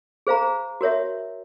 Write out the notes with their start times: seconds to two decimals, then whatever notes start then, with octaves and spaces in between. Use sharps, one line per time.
0.27 G#4 C5 F5 A#5
0.81 F#4 A#4 C#5 E5